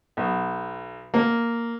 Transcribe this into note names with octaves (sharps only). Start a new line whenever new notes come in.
B1
A#3